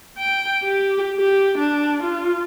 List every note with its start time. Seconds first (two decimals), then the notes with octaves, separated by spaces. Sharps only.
0.18 G5
0.64 G4
1.19 G4
1.58 D4
2.03 F4